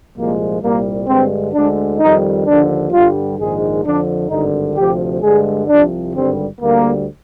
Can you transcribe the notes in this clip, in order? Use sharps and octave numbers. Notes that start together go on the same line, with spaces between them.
C2 A#2 F3 G#3 A#3
C2 A#2 G3 A#3
G2 D3 G#3 C4
D2 D3 G#3 D4
F2 D#3 G3 D#4
D#2 D3 F3 D4
G2 D3 G3 F4
A#1 G#2 D#3 G#3 G#4
F2 D3 F3 D4
G#1 G2 D3 D#4
D2 C3 F3 G4
G2 D3 G#3 G#4
C2 C3 F3 D4
G#1 G2 D3 G3 C4
D2 D3 G3 A#3